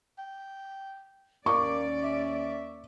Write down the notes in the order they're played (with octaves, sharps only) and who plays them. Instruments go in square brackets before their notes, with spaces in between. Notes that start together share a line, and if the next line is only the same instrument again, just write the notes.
[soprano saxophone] G5
[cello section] D#2 C#4 D5 [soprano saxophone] A#3 [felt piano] C#6 D6
[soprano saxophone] E5